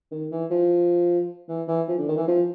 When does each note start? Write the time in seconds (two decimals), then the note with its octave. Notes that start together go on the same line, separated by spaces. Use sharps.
0.11 D#3
0.31 E3
0.51 F3
1.48 E3
1.68 E3
1.88 F3
1.98 D3
2.08 D#3
2.17 E3
2.28 F3